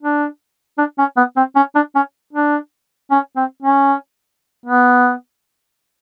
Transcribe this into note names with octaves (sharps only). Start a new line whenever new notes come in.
D4
D4
C#4
B3
C4
C#4
D4
C#4
D4
C#4
C4
C#4
B3